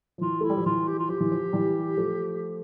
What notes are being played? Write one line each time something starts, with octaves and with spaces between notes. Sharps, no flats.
F3
E3 F4
A3 E4
G3
F3
E3 F4
G4
F4
F3 G4
E3
F3
E3 G3
F3 A3